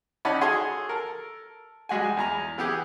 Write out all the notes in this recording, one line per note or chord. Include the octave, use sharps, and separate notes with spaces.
C#4 D#4 D5 F#5 A5 B5
F#4 G#4 A4 C#5 C6 D#6
A4 A#4
G3 G#3 F#4 G#5
E2 G#5 A#5
E3 B3 G4 G#4